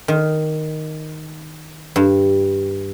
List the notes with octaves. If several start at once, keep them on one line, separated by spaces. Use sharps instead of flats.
D#3
G2